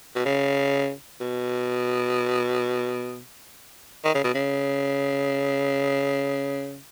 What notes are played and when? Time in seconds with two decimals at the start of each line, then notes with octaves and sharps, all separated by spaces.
0.16 B2
0.25 C#3
1.21 B2
4.05 D#3
4.15 C#3
4.24 B2
4.34 C#3